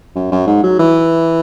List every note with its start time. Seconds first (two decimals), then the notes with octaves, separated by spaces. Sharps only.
0.15 F#2
0.32 F#2
0.47 G#2
0.63 F#3
0.79 E3